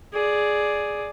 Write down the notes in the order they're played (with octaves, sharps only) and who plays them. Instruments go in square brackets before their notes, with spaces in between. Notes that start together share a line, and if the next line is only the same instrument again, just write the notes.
[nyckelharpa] G#4 D5